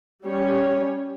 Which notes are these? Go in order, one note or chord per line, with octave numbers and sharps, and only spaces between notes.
G3 C#4 G4 C#5